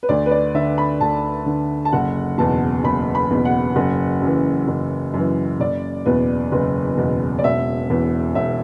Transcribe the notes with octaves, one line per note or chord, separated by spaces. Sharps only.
B4
D2 D5
B4
D5
D3 E5
B5
D2 A5
D3
A5
F#1 F#5
E2 B2 A5
F#1 B5
B5
E2 B2
F#5
F#1
F#2 E3
F#1
F#2 E3
F#1 D5
E2 B2 B4
F#1 B4
E2 B2
D5
E1 E5
E2 E3
E1 E5